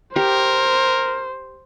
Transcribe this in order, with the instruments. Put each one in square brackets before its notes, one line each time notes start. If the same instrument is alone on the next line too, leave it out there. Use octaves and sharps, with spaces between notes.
[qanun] G4 [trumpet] A#4 [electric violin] C5